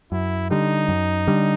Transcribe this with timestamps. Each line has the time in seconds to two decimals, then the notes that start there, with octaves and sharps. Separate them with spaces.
0.12 F#2 E4
0.51 D3 G3 D#4
0.89 F#2
1.27 D3 G3